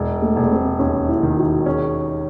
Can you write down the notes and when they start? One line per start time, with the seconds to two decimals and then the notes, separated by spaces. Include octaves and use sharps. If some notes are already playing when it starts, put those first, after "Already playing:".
Already playing: E1
0.22 A3
0.36 E1
0.43 A3
0.51 C4
0.79 D#2 C#4
1.09 E4
1.23 D#3
1.37 F#4
1.65 C#4 G#4